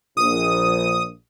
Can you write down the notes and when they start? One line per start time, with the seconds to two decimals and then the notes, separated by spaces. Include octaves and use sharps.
0.17 A#1 D#6